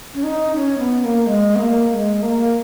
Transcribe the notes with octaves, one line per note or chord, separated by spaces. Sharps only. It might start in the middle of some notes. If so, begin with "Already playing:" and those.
C#4
D#4
C#4
B3
B3
A#3
A#3
G#3
B3
A#3
A#3
G#3
A#3